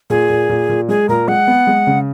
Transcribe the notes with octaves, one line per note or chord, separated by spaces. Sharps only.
A#2 G#4
A#2
A#2
A#2
G#3 G#4
A#2 A#4
G#3 F#5
B3
G#3
C#3